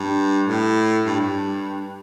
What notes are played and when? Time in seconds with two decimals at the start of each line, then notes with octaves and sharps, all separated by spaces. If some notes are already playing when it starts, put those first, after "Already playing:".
Already playing: G2
0.46 A2
1.06 G2
1.20 G2